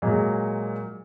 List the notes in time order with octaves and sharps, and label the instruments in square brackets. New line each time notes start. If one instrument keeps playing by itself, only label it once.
[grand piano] A#2 F#3 G#3